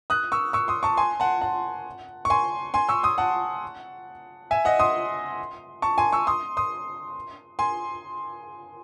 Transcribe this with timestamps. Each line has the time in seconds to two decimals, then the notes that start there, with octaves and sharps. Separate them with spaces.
0.10 D#6 F#6
0.32 C#6 E6
0.53 C#6 E6
0.68 C6 D#6
0.83 A5 C#6
0.97 G#5 C6
1.20 F#5 A5
1.41 F#5 A5
2.25 C#6
2.30 G#5 C6
2.74 G#5 C6
2.89 C#6 E6
3.03 C6 D#6
3.18 F#5 A5
4.51 E5 G#5
4.65 D#5 F#5
4.80 C6 D#6
5.82 A5 C#6
5.98 G#5 C6
6.12 C#6 E6
6.27 C6 D#6
6.57 C6 D#6
7.59 G#5 C6